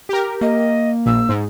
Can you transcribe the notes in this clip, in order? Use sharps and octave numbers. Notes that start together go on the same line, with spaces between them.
G4 A#4
A#3 D#5
A#1 E6
G#2